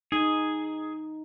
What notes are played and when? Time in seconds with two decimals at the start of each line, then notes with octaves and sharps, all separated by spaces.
0.12 D#4 G#4